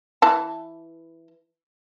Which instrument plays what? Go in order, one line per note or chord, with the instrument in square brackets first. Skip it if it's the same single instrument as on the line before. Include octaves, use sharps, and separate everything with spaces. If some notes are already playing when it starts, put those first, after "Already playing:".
[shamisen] E3 A5